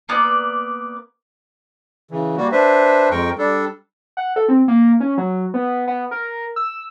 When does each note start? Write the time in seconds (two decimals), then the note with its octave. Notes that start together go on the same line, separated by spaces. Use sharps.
0.09 A#3 B3 D5
2.11 C#3 E3
2.37 G3 A#3 F#4
2.52 D4 B4 C5 E5
3.11 F2 G#3 A#4 G5 C#6
3.38 G3 D4 A4
4.17 F#5
4.36 A4
4.49 C4
4.68 A#3
5.00 C#4
5.18 F#3
5.54 B3
5.87 B3
6.11 A#4
6.56 E6